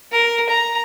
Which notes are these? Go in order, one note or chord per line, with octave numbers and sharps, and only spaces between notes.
A#4
A#5